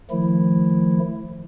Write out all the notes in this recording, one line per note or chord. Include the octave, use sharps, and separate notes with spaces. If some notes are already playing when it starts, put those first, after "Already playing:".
D#3 F3 A3 E4